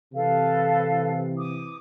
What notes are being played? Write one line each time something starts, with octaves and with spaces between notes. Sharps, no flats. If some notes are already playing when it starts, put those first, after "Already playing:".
C3 E3 A4 B4 F5
D6 D#6